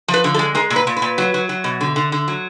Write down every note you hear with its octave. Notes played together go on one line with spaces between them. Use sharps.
F3
B4
D3
A4
G#3
G#3 A#4
A#2
B4
A#2
B4
A#2
F#3
F#3
F#3
B2
D3
D3
D3
F#3